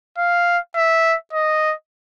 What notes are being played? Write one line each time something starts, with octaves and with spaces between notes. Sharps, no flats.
F5
E5
D#5